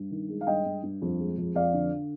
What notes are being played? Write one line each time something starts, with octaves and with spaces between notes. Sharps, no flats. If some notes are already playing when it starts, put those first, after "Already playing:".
Already playing: G2
D#3
G#3
F5
G2 D#5 G5
G2
G2
F2
G#3
F2
F2 D5 F5
D3